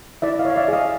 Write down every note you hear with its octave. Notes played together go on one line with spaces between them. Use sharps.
E4 D5 E5
D#5 F5
C#5
F5
D5 E5
G#4 D#5 F5